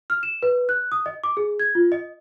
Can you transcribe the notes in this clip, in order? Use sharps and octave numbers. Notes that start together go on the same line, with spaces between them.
F6
E7
B4
F#6
D#6
D#5
D6
G#4
G#6
F4
D#5